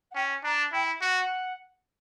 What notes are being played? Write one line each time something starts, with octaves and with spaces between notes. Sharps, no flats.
F#5
C#4 G5
D4 A#5
E4 G5
F#4 F#5